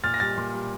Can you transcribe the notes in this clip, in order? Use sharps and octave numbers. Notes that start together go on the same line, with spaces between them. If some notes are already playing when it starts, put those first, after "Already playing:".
A#2 F6 A6
A#6
G3 F6 A6
A#2
G3